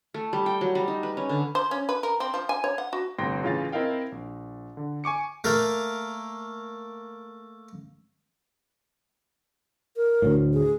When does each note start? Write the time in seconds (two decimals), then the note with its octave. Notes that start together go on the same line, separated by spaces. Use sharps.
0.14 A3
0.33 G3
0.46 G5
0.61 F#3
0.75 G3
0.88 D#4
1.03 B4
1.17 C#4
1.29 D3
1.55 C5
1.71 C#4
1.89 B4
2.03 A#4
2.20 C4
2.34 F3
2.49 G#5
2.64 C#5
2.78 F#5
2.93 F#4
3.18 G1 A2 C3 G5 C6 A#6
3.43 A2 C#3 E3 F4 F5 A6
3.72 C4 E4 A#4 D#5 F5 G5
4.12 A#1
4.77 D3
5.04 G#5 C#6 D6 C#7
5.44 A3 A#3 A#4
9.96 A#4
10.22 D2 A2
10.53 G#4